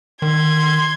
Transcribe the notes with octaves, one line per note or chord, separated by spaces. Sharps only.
D#3 C6 G#6